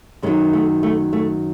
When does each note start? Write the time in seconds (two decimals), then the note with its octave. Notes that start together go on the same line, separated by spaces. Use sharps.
0.22 F#2 D#3 F#3 G#3
0.53 A3
0.83 A3
1.13 A3